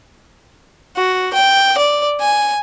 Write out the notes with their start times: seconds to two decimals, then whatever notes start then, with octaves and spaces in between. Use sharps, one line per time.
0.96 F#4
1.34 G5
1.78 D5
2.20 G#5